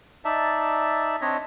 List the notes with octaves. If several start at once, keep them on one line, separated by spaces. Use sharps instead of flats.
D#4 D5 E5 A5
C4 D4 C#5 D#5